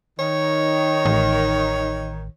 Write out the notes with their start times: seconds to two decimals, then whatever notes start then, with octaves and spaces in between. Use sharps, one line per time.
0.19 D#3 C#5
1.06 A1